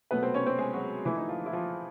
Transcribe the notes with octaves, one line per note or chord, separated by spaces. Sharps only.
B2 F#3 A3 B3 B4
C4 C5
C#4 C#5
C4 C5
G#3 G#4
F#3 F#4
D3 E3 F3 A3 E4
D#4
F3 F4
E4
F3 F4